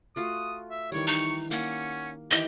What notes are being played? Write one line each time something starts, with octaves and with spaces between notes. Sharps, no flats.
A3 F4 F#4 D#6
E5
D#3 E3 G3 C#5
D#4 C#6
A#3 C#4 F#5
D#3 E3 G4 D#5